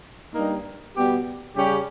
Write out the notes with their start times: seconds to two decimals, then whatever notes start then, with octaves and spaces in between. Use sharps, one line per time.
0.33 G2 G3 A#3 D#4
0.95 B2 G3 B3 G4
1.55 C#3 G3 C#4 G4